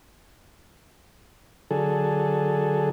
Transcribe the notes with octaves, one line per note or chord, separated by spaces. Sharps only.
D3 F#3 G#4 A4